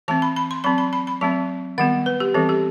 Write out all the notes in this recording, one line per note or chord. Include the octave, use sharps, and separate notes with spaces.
E3 A3 C4 A5
B5
B5
C6
F#3 C4 B5
B5
B5
B5
F#3 A3 C4 A5
D#3 G3 B3 F#5
B4
G4
E3 G3 C4 A4
G4